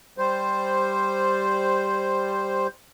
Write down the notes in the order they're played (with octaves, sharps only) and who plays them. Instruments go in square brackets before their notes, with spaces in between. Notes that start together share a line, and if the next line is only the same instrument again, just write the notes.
[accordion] G3 C5